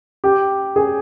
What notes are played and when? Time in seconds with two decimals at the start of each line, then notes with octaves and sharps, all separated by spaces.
0.24 G4
0.76 G#4